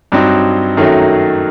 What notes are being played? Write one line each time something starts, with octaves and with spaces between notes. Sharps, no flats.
G2 F#3 C4 D#4
F#2 D#3 F#3 A3